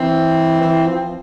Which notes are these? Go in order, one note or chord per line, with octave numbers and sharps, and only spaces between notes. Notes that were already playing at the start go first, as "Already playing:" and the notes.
Already playing: E3 C4
E3
F3